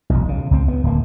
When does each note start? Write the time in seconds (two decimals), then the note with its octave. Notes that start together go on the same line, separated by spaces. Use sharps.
0.10 E1 B1
0.28 C#3
0.51 C#2 C4
0.68 B3
0.84 D1 A#3